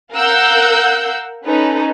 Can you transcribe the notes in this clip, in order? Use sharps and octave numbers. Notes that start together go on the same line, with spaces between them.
A#4 F5 F#5 E6 F#6 G6
C#4 D#4 A4 B4